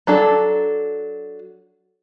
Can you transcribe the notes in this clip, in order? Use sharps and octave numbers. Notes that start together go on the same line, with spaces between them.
F#3 D4 A4